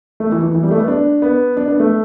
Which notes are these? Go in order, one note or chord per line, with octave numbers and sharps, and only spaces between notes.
A3
E3
E3
E3
G3
A3
B3
D4
B3
D4
B3
A3